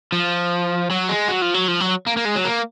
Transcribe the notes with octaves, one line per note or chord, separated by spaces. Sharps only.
F3
F#3
G#3
F#3
F3
F#3
F3
F#3
A#3
A#3
G#3
F#3
A#3